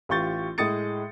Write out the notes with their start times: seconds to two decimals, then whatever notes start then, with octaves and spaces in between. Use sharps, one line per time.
0.09 A1 F4 G4 C#6 G6 A6
0.58 A2 G#3 D#6 A6 C#7